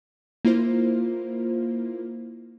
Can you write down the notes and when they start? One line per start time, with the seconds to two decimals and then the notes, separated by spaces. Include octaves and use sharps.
0.45 A#3 E4 F4 C5